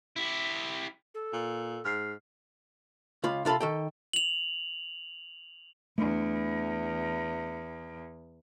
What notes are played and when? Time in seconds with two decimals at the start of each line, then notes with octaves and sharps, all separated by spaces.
0.16 E4 G4
1.14 A4
1.33 A#2
1.85 G#2 F6 C7
3.24 C#2 F4 B5
3.45 C3 F4 A4 F5 B5
3.60 D#3 A4 G5
4.13 F7 F#7
5.98 E2 A3 D4